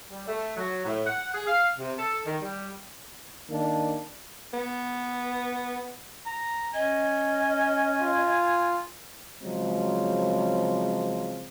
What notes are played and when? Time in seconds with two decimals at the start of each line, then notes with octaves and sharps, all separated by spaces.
0.11 G3
0.27 A3
0.57 F#3
0.85 A2
1.06 F#5
1.35 G#4
1.47 F5
1.78 C3
1.98 A4
2.26 D#3
2.41 G3
3.49 D#3 A#3 D4
4.54 B3
6.26 A#5
6.74 C#4 D#5 G#5
8.02 F4
9.42 C#3 F3 F#3 G#3 C4